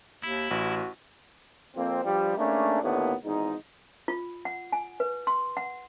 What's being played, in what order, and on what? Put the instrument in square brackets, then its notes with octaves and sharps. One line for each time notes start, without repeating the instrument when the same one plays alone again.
[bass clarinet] D#2 [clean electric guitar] E4
[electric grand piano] A1 [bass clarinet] F#4
[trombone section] F2 A#3 C4
G2 F3 G3
G#2 A3 A#3 C#4 D4
D#2 A2 D3 A#3 B3
G#1 E2 G#2 D#4
[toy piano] F4
F#5
G#5
B4
C6
F#5